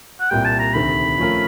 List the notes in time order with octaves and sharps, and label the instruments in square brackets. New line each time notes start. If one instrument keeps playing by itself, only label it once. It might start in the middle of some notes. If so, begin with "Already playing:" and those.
[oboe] F#5
[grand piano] C2 A#2 G3 [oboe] G5
[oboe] A5
A#5
[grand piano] D2 C3 D#3 [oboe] B5
[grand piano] F3 A3 C#4 F4 A#4